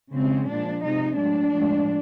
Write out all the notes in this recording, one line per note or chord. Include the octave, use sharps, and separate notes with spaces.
C#3 F3 G#3 C4
A#2 F3 G#3 D4
C3 F3 G#3 D#4
A2 F#3 D4
A2 F3 G#3